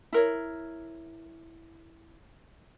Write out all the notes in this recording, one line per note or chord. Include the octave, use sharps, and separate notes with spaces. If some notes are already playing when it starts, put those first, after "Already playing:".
E4 A#4 C#5